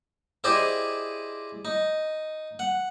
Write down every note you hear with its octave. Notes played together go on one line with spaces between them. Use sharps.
E4 G4 G#4 C5 D5 D#5
D#4
F#5